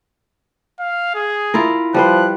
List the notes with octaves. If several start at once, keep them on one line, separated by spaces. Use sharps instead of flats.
F5
G#4
E4 F4 A#4
F3 G3 B4 C5 F#6